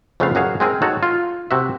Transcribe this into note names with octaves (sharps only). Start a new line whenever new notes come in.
F2 C#3 A3 B3 B4 F5
F#2 F#4 G#4 F5 F#5
G#3 C4 G#4 A#4
D#4 F#4 A4 C#5
F4
C3 F#4 E5